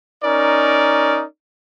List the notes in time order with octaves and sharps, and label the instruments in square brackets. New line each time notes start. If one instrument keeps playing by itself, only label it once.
[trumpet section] C#4 D#4 A#4 D5